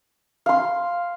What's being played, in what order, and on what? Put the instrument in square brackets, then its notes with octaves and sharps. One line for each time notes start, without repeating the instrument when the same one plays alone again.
[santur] F5 C6